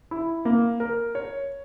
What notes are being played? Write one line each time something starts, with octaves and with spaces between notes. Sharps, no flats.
E4
A#3
A#4
C#5